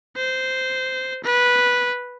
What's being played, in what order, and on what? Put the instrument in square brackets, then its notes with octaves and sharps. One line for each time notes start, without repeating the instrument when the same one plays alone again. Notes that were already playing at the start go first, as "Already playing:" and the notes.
[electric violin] C5
B4